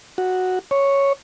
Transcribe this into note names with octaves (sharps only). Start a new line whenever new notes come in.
F#4
C#5